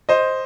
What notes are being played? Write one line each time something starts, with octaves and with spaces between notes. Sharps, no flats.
C5 D#5